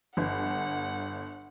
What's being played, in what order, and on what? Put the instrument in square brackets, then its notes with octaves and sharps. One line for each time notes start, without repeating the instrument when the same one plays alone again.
[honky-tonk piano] G1 [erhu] F#5